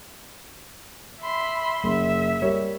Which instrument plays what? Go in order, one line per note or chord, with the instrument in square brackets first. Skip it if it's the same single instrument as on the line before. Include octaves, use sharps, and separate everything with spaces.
[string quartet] E5 B5 C6
[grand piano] F#1 [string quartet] E5
[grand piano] G3 A#4 C#5